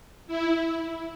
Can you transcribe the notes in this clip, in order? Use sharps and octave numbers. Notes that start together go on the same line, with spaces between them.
E4